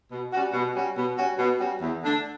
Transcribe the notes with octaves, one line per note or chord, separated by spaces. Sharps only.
B2
G3 C#4 F#4
B2
G3 C#4 F#4
B2
G3 C#4 F#4
B2
G3 C#4 F#4
E2
D3 A3 D4